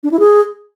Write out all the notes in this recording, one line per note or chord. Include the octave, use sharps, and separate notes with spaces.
D4
E4
G#4